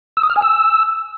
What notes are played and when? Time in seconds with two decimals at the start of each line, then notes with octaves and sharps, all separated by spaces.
0.17 E6
0.23 D#6
0.30 F6
0.36 G#5
0.42 E6